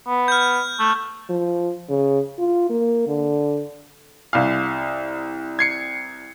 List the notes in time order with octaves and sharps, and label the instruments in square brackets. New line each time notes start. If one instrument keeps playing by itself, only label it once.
[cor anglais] B3
[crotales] F6 G6
[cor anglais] A3
[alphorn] F3
C#3
F4
A#3
D3
[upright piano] C2 F5
[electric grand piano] G#6 C7 C#7